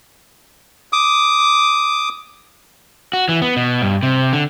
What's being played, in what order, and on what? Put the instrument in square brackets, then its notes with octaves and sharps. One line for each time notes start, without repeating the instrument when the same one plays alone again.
[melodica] D6 D#6
[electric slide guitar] F#4
E3
B3
B2
G2
C3
D3